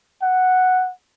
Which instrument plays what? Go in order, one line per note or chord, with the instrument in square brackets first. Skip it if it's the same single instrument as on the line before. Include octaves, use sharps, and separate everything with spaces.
[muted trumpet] F#5